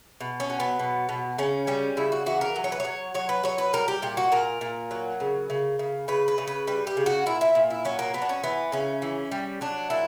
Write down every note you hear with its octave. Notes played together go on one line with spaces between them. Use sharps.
B2
C#4
F#3
B3
B2
B2
C#3 C#4
G3 C#4
C#3 E4
F#4
E3 F#4
A#4
F#3
C#5
B4
F#3 C#5
F#3 C#5
B4
F#3 C#5
B4
G3 A#4
G4
A#2 G4
F#4
A#2 A#4
A#2
F#3
C#3
C#3
C#3
C#3 B4
B4
C#3
B4
G3 B4
G4
C#3
F#4
A#2 E4
E4
A#2
E4
F#3 C#4
A#3
F#3 B3
D4
C#4
E3 B3
C#3 C#4
E3
G3
F#3 D4
A#2 E4